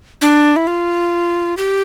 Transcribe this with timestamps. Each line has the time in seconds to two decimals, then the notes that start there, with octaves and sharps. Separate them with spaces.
0.21 D4
0.56 E4
0.67 F4
1.57 G4